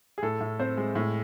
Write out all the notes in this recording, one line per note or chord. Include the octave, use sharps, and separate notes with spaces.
G#4
A2 A4
A2
C4 C5
G#3
A2